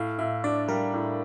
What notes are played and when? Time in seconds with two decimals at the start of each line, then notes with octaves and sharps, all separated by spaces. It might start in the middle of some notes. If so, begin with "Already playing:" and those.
Already playing: A2 F5
0.19 A2 E5
0.44 D4 D5
0.68 G3 A#4
0.93 A2